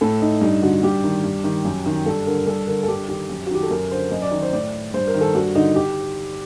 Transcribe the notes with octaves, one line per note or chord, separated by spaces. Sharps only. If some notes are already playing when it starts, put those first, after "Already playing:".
A2 A4
D#4
G2 D#4
D3 F#4
G2 G4
D#3
G2
D#3
F#2
D#3
G2 A4
D3 A#4
G2 A4
D3 A#4
A4
G2 G4
D#3 G4
F#2
F#4
D#3 G4
A4
F#2 A#4
D3 C5
F#2 D#5
D5
D#3
C5
A2 D5
G2 C5
A#4
D#3
A4
G2 F#4
D3 D#4
G4